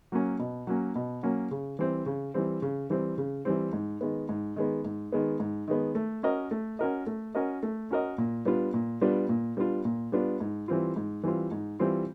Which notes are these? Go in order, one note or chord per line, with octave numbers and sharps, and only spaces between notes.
F#3 A#3 C#4
B2
F#3 A#3 C#4
B2
F#3 A#3 C#4
C#3
E3 G3 C4
C#3
E3 G3 C4
C#3
E3 G3 C4
C#3
E3 G3 C4
G#2
D#3 G#3 B3
G#2
D#3 G#3 B3
G#2
D#3 G#3 B3
G#2
D#3 G#3 B3
A3
C#4 F#4 A#4 D#5
A3
C#4 F#4 A#4 D#5
A3
C#4 F#4 A#4 D#5
A3
C#4 F#4 A#4 D#5
A#2
G3 B3 D4 F4
A#2
G3 B3 D4 F4
A#2
G3 B3 D4 F4
A#2
G3 B3 D4 F4
G#2
E3 G3 C4 F4
G#2
E3 G3 C4 F4
G#2
E3 G3 C4 F4